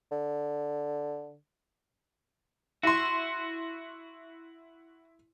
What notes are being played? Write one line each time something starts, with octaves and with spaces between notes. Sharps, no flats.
D3
E4 F#4 C6